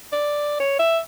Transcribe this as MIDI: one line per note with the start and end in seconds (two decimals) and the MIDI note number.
0.13 0.56 74
0.60 0.77 73
0.79 0.99 76